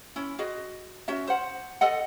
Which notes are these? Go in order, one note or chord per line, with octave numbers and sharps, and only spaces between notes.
C#4 E4
F#4 G#4 D#5
C#4 F#4 E5
C5 F#5
A4 D#5 F#5